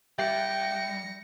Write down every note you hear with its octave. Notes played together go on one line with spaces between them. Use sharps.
G3 E5 G5 A#6 C#7